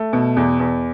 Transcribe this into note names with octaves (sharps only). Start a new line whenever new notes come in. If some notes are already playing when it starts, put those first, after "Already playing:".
Already playing: A3
B2
E2
E2